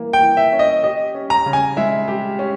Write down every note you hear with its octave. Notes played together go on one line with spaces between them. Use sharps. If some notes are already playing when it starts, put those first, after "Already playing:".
Already playing: E3 A#3
G5
E3
E5
C#4
D#5
G4 D#5
C#4
A#5
C#3
G#5
G#3 E5
G4
C#4